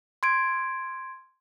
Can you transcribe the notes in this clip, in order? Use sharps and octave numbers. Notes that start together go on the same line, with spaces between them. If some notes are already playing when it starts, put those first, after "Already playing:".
C6 G#6 D7